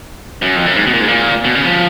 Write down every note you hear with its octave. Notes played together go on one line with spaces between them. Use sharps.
F#2
F2
F#2
G#2
B2
A#2
G#2
A#2
B2
C#3
F3